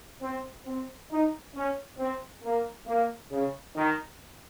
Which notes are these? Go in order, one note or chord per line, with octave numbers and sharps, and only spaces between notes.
C4
C4
D#4
C#4
C4
A#3
A#3
C#3
D#3